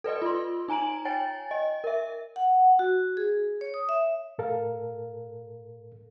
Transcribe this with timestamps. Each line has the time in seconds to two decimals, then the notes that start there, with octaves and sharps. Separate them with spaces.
0.04 A4 B4 D5 D#5
0.22 F4 C6
0.68 D#4 G#5 A#5 D7 F#7
1.05 C#5 G5 G#5 A6
1.51 D#5
1.84 A#4 E5
2.36 F#5
2.79 F#4
3.17 G#4
3.61 C#5
3.74 D#6
3.89 E5
4.38 A2 A4 A#4 F5